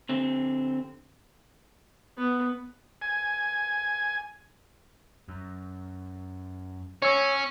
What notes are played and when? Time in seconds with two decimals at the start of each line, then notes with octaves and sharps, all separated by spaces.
0.09 D3 C4 G4
2.18 B3
3.02 G#5
5.29 F#2
7.02 C#4 C#5 E6